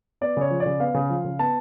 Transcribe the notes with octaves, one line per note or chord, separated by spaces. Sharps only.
B3 D5
C#3 C#5
F3
D5
C#3
B3 F5
C#3
F3
C#3
B3 A5